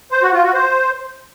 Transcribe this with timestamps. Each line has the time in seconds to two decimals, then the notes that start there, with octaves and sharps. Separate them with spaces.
0.12 C5
0.22 F#4
0.33 F4
0.43 F#4
0.54 C5